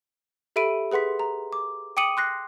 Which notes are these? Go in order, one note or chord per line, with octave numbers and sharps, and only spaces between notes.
G4 A4 E5 B5 D7 D#7
G#4 B4 F#5 C6 B6
A#5
D6
G5 D6 D#6 C#7 D#7 F#7
C6 F#6 A#6 C7